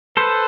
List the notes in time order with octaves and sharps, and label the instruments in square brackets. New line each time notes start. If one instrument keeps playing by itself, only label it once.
[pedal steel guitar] A4 C5 [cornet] B4